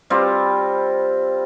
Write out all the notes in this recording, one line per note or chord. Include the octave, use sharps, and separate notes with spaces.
G3 C4 F4